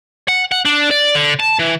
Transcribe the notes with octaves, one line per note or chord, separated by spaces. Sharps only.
F#5
F#5
D4
D5
D3
A5
E3